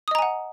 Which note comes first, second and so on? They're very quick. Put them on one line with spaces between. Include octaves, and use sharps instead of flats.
D#6 D#5 A#5 G#5 F#5